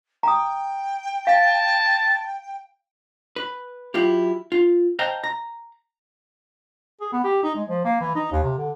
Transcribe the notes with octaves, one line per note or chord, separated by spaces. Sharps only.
G5 A#5 D#6
F5 A5
B4
F#3 E4 F4 G4
F4
C5 D#5 F5 G5 A5 A#5
A#5
G#4
B3
G4
D#4
G#3
F3
A#3
E3
D#4
D#2
C3
D3